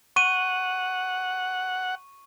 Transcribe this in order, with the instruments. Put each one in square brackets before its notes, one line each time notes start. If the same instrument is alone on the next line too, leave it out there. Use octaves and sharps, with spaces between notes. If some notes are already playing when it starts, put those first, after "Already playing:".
[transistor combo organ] F#5 [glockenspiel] C#6 D#7